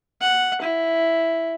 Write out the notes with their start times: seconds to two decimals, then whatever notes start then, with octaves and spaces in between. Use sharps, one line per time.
0.21 F#5
0.61 E4